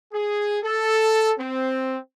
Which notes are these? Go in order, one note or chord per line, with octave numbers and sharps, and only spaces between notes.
G#4
A4
C4